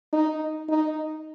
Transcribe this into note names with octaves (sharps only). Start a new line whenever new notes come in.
D#4
D#4